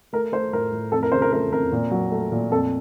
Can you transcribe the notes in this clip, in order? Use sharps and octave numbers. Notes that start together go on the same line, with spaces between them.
A3 A#4
A3 C5
A2 A#4
A2
F2 A4
A#4
C#3 C5
A#4
A3 A#4
F2 A#4
A#2
F#3
A3
A#2
F2 A4